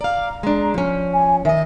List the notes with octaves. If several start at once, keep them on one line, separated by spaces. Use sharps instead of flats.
D5 F5 A#5
G#3 D4
F3 C#4
G#5
D#3 D#5 E5